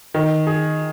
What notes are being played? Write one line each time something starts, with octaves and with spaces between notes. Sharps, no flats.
D#3
G#4